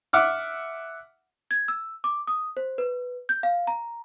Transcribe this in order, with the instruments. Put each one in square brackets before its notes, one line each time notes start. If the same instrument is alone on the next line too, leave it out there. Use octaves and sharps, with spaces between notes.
[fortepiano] E5 F#5 D6 F6
[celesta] G#6
E6
D6
D#6
C5
B4
G6
F5
A#5